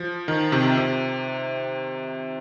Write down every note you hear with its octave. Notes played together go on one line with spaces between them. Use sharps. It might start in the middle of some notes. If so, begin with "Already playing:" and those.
Already playing: F3
D#3
C3
C3